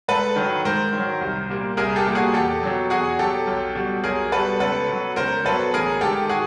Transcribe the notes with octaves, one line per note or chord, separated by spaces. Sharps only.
G#2 A4 B4
D#3 F#3
G#2 A#4 C5
D#3 F#3
C2
A#2 G3 A#3
C2 G#4 A#4
G4 A4
A#2 G3 A#3
F#4 G#4
E2 G4 A4
B2 F#3
E2 F#4 G#4
B2 F#3 G4 A4
B1
B2 G3
B1 G#4 A#4
B2 G3 A4 B4
C#2 A4 B4
B2 F#3
C#2 A#4 C5
B2 F#3 A4 B4
A1 G#4 A#4
G#2 D#3 G4 A4
F#4 G#4